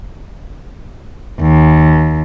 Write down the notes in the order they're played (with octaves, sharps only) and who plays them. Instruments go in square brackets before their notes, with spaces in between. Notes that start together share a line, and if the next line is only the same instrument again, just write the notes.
[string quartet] D#2